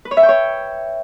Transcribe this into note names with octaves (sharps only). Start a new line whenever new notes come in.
B4
C#5
E5
G5
C#5